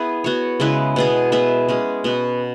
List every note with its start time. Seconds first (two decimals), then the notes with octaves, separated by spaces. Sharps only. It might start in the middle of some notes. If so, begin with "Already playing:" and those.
Already playing: B3 E4 G#4 B4
0.24 B3 F#4 C#5
0.60 C#3 G#3 E4 B4
0.96 B2 B3 G#4
1.32 B3 G#4 B4 E5
1.68 G#3 C#4 G#4
2.04 B2 B3 F#4 B4